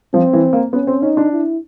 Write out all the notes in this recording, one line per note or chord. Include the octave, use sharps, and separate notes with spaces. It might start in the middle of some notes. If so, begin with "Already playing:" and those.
F3 C4
E3
A#3
B3 C#4
C4
C#4 D#4
D4
E4